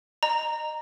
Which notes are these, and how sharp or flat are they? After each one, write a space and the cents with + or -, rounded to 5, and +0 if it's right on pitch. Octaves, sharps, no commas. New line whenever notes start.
D#5 -30 A#5 +0